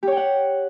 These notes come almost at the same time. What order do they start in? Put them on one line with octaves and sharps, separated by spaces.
G4 C#5 G5 F#5